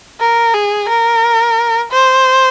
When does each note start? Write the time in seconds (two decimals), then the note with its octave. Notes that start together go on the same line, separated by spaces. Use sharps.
0.20 A#4
0.54 G#4
0.89 A#4
1.92 C5